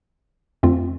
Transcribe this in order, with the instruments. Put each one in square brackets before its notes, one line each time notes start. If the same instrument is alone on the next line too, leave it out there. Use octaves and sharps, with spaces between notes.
[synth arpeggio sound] F2 D3 A3 C4 F4